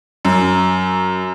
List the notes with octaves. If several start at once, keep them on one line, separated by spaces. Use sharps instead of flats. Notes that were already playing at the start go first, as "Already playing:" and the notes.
F#2